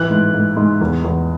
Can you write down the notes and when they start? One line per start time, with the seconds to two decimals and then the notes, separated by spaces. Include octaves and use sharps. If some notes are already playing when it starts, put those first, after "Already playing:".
Already playing: A2 E3 F#6
0.10 G#2
0.34 G#2
0.57 G#2
0.81 E2
1.04 E2